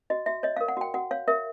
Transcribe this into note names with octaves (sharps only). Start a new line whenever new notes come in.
F#4 D#5
F#4 E5
C#5 D#5
F5
A#4
F#5
F#4 G5
F#4 F#5
C#5 F5
A#4 E5